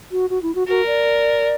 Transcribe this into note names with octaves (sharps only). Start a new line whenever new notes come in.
F#4
F#4
E4
F#4
F#4 A#4
D5